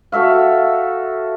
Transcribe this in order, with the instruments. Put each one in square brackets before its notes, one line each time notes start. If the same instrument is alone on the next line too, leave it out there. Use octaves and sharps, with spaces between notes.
[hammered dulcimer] F#4 A4 E5 F5